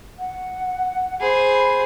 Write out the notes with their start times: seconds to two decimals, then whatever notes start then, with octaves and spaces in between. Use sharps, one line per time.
0.19 F#5
1.20 G#4 C5 B5